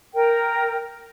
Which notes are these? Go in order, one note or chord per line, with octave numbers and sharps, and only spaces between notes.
A#4 G5